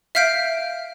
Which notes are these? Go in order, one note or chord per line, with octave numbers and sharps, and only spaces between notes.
E5 F5 F6 G6 B6 D7